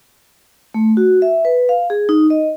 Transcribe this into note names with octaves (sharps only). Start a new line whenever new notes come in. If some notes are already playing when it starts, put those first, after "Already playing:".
A3
F#4
E5
B4
F5
G#4
D#4
D#5